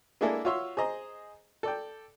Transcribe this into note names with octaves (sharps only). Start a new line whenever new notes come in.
G#3 A#3 D4 E4 G#4 A4
F4 F#4 C#5 E5 C6
G#4 C5 D#5 A#5
A4 D5 G5